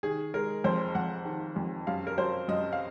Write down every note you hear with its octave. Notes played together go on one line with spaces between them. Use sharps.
D#3 G#4
G#3 A#4
F2 C5
F2 F#5
D#3
F2
F#2 F5
A#4
F#3 C5
F#2 D#5
F5